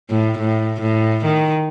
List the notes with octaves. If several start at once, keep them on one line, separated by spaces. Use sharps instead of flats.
A2
A2
A2
D#3